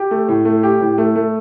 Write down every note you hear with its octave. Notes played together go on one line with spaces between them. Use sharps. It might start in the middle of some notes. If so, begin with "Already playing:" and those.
Already playing: G4
A3
A2
A3
G4
A2
A3
A3